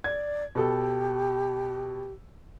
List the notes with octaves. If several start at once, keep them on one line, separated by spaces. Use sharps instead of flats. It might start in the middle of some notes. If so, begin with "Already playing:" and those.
D5 G#6
B2 G4 A4 E6